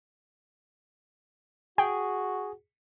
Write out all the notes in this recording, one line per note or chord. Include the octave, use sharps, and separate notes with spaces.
F#4 G#4 G5